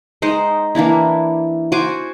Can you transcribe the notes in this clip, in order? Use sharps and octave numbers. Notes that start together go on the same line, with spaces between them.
G#3 D#4 C5 D#5
E3 A#3 D4 E4
F#4 C5 G#5 D6